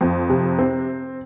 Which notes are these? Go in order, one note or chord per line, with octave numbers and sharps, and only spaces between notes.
F2
C3
C4